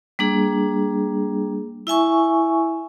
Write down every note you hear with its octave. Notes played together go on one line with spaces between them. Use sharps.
G3 A#3 D4 G#4
E4 E5 G#5 C#6